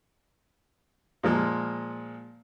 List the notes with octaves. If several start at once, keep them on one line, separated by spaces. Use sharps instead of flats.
A#2 F3 G#3